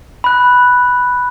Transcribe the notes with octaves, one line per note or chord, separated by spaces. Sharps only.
B5 F#6